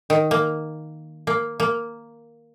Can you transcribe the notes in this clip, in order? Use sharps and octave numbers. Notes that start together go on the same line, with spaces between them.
D#3
A#3
A#3
A#3